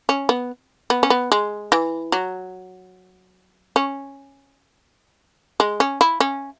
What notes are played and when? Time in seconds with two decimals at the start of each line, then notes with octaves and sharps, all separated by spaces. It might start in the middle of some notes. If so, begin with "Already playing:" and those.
0.09 C#4
0.29 B3
0.90 B3
1.03 C#4
1.10 B3
1.32 G#3
1.72 E3
2.12 F#3
3.76 C#4
5.60 G#3
5.80 C#4
6.01 E4
6.20 C#4